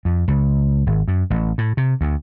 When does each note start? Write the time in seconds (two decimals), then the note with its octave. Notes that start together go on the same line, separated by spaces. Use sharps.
0.05 F2
0.28 C#2
0.86 G#1
1.08 F#2
1.30 A1
1.58 A2
1.77 C3
2.01 D2